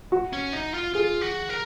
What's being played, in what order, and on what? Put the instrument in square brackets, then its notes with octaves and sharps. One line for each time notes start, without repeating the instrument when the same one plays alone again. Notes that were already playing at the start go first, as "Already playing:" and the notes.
[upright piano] F#4
[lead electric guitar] C#4
D#4
F4
[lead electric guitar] F4 [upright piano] G#4
[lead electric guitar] F#4
A#4